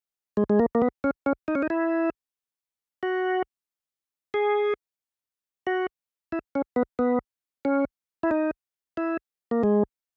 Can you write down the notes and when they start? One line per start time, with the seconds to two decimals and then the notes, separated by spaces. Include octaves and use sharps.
0.37 G#3
0.50 G#3
0.59 A#3
0.75 A#3
0.82 B3
1.04 C#4
1.26 C#4
1.48 D#4
1.55 C#4
1.62 D#4
1.70 E4
3.03 F#4
4.34 G#4
5.67 F#4
6.32 E4
6.55 C#4
6.76 B3
6.99 B3
7.65 C#4
8.23 E4
8.31 D#4
8.97 E4
9.51 A#3
9.63 G#3